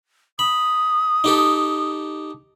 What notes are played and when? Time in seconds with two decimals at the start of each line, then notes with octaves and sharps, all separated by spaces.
0.39 B5 D#6
1.24 D#4 G4 A4